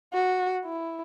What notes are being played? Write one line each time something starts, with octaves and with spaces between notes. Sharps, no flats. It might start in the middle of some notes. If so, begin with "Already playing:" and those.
F#4
E4